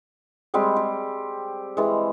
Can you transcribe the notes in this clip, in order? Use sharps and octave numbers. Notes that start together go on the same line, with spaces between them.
G3 G#3 C4 G4
G4
E3 G#3